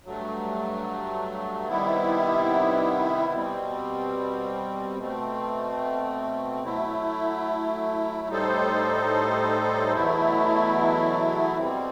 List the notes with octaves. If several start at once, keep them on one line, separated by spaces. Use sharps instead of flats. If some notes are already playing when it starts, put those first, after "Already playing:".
G2 F#3 A3
C3 D#3 G3 B3 E4
B2 G3 C4
B2 A3 C4
F#3 A3 E4
A2 G3 D#4 A4 C5
E2 B2 F#3 A3 E4
B2 G3 C4